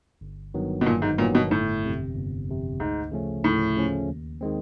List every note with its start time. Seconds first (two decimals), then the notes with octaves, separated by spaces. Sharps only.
0.21 G1
0.54 G2 D#3 F#3 B3
0.81 B2
0.86 G1 A#2
1.02 G#2
1.18 G2 A#2 D#3 F#3 B3
1.35 B2
1.51 G1 A2
1.83 F2 C3
2.16 G1
2.48 F2 C3
2.80 D2 G#2
3.12 C#3 F3 A3 C#4
3.44 D2 A2
3.76 C#3 F3 A3 C#4
4.09 D#2
4.41 D#3 G#3 C4